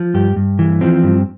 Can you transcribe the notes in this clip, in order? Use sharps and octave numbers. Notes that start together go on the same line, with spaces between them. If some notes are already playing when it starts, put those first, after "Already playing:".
Already playing: F3
G2 G4
G2
E3
F3 C4
G2